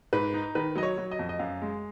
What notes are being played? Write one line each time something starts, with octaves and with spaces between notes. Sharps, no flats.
G#2 B4
D#4
D#3 B4
F#3 D#5
C#5
F#3
D#5
F2
D#5
F#2 F5
G#3